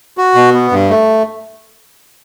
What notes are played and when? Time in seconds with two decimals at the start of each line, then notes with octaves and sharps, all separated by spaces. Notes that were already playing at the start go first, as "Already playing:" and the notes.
0.18 F#4
0.35 B2
0.53 B3
0.71 G2
0.90 A3